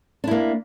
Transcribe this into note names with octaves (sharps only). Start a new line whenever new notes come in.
A#3 D4 E4